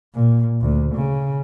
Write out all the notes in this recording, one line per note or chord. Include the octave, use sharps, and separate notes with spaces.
A#2
D2
C#3